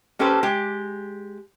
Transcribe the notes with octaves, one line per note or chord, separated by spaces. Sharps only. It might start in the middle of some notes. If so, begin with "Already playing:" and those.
A#3 C#4 G4 A4 B4 C5
G#3 G4